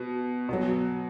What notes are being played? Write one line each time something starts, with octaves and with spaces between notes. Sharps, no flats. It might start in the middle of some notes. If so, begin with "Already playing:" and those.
Already playing: B2
B2 F#3